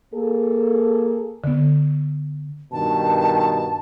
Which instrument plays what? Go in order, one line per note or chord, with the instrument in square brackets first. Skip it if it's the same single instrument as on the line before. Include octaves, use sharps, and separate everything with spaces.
[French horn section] A#3 G#4 A4
[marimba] D3 B3
[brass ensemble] G2 B2 D#3 [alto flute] A5